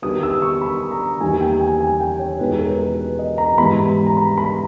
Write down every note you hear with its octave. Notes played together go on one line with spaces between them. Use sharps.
D#3 G3 B3 D#6
E6
C#6
B5
A#5
E2 D#3 G3 A#3 D#4 G#5
G5
G#5
G#5
G5
C#5
E2 B2 G#3 D#4 B4
A#4
B4
D#5
A#5
G#2 E3 G3 B3 B5
A#5
B5
B5